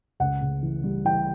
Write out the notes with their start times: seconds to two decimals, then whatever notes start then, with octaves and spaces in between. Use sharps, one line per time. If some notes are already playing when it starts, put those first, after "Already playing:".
0.20 C#2 F#5
0.41 C#3
0.63 E3
0.83 G3
1.05 E3 G5